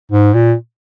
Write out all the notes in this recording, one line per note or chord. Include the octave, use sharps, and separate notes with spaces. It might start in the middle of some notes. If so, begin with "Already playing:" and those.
G#2
A#2